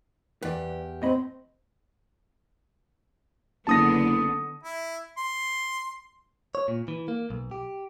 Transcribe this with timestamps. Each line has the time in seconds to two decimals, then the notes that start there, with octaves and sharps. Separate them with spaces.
0.43 E2 G4 B4 D5
1.02 A2 C4 D#5 B5
3.67 F#1 D3 B3 A5 D#6 A#6
4.63 E4
5.17 C6
6.55 C#5
6.68 A#2
6.88 E3
7.08 A#3
7.30 B1
7.51 G4